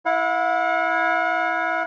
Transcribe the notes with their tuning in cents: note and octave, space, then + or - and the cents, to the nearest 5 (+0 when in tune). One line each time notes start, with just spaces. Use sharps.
E4 +0 F#5 -45